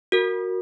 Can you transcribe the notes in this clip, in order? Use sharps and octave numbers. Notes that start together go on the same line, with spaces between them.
F#4 A#4